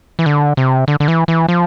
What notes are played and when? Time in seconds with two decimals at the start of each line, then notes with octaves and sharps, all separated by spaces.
0.19 E3
0.26 D3
0.57 C3
0.88 D3
1.00 D3
1.08 E3
1.28 E3
1.48 F3